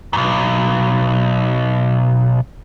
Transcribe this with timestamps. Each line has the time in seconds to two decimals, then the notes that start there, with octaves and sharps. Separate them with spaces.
0.13 B1 F#2